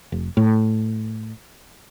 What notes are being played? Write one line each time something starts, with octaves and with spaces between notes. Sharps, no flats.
F1
A2